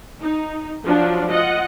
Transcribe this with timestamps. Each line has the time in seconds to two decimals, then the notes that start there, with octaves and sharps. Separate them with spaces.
0.21 D#4
0.85 F3 F#3 D4 F4
1.30 F4 D#5 F#5